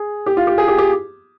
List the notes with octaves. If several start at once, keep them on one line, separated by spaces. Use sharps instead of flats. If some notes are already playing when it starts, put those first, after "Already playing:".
Already playing: G#4
G4
F4
G4
G#4
G4
G4